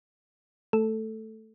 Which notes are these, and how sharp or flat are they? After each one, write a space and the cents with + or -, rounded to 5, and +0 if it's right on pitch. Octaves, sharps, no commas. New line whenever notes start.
A3 +0 A4 +0